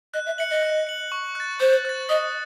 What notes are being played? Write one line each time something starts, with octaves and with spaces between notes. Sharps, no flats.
D#5 F#6
E5
E5 C#7 F#7
D#5
F#6
C#7 F#7
C#6
F#6 A6
C5 C#6
F#6 A6
D#5 D#6